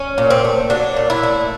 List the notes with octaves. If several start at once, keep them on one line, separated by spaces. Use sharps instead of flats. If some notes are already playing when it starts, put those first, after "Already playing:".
Already playing: C#4
A#2
C4
A3
F#3 D4
A#2
E4
A3